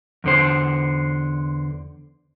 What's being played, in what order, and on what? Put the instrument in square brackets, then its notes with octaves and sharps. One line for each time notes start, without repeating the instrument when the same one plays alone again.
[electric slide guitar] E2 D3 C5